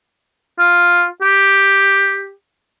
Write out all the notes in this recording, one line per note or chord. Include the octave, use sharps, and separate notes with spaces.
F4
G4